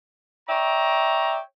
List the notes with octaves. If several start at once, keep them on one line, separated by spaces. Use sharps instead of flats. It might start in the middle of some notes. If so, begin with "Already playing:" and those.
C#5 D5 E5 G5 A#5